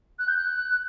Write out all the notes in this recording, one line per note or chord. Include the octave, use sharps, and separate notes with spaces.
F#6
G6
F#6